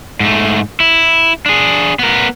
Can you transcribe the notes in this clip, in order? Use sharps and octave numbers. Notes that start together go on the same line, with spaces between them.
G#2 A3
E4
D4 G#4
B3 A#4